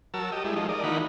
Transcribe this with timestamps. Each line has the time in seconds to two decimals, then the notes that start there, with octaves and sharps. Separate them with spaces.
0.14 F#3 A#4 A5 E6
0.32 G4 D#5
0.44 G3 G#3 E4
0.56 F3 G#3 A3 D#4
0.69 A#4 D5 D#5
0.83 D#3 E3 A#3 D#4 F#4 B5